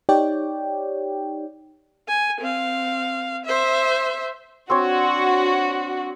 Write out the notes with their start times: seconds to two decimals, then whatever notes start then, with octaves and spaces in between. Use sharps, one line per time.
0.09 D#4 G4 C#5 D5 G5
2.07 G#5
2.40 C4 F5
3.45 C5 E5
4.70 C4 D4 F#4 C#5